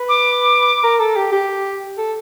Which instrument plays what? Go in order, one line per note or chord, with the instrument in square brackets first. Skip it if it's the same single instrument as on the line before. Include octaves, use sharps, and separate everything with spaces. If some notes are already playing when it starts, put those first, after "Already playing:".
Already playing: [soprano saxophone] B4
[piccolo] D6
[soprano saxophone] A#4
A4
G4
G4
A4